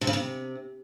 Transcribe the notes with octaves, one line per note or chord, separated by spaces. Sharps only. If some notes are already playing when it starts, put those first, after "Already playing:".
C3
C#3
C3